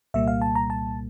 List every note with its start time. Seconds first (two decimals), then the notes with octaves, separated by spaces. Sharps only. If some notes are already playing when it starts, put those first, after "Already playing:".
0.14 C2 A#2 G3 A#3 E5
0.28 F5
0.42 A5
0.55 A#5
0.70 A5